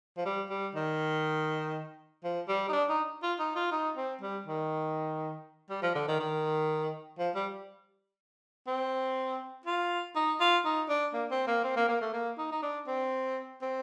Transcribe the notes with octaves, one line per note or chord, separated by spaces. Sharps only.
F3
G3
G3
D#3
F3
G3
D#4
D4
D#4
F4
D#4
F4
D#4
C4
G3
D#3
G3
F3
D3
D#3
D#3
F3
G3
C4
F4
D#4
F4
D#4
D4
A#3
C4
A#3
C4
A#3
A#3
A3
A#3
D#4
D#4
D4
C4
C4